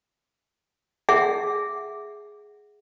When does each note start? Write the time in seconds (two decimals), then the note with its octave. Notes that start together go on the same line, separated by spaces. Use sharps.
1.09 G#4 E5 F#5